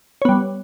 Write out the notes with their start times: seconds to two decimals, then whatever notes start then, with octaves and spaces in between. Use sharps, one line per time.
0.22 C#5
0.25 B3
0.29 G3